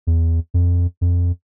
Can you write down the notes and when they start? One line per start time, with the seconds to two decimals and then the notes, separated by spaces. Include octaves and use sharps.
0.07 E2
0.54 F2
1.01 F2